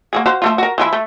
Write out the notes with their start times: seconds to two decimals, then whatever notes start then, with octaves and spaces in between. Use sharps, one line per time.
0.13 A#3 F#4 G#4
0.26 F#4 C5 F5
0.42 F3 A3 F4
0.58 F#4 A#4
0.78 E3 F3 E4
0.93 A3